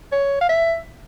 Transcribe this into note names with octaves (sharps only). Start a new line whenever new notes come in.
C#5
F5
E5